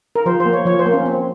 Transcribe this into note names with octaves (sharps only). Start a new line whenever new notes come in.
A#4
F3 C5
C5
A#3
C#5
F3 C#5
C5
A#3
C#4
C4